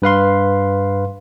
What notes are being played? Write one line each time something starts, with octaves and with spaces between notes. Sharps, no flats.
G2 B4 F5 C6